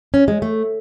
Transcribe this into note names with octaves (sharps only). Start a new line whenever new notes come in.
C#4
G#3
A3